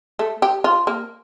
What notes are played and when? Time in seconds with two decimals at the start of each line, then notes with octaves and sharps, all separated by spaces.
0.19 A3
0.42 G4
0.64 F4
0.87 A#3